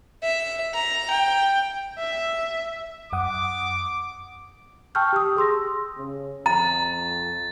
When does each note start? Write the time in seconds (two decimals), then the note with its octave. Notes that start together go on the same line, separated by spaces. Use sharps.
0.23 E5
0.74 A#5
1.11 G5
1.98 E5
3.13 F#2 F#5 D6 D#6
4.95 G5 A5 C#6 E6 F6 G6
5.13 G4 D#6
5.37 G#4 C6 E6 A#6
5.98 C#3
6.46 F2 A#5 A6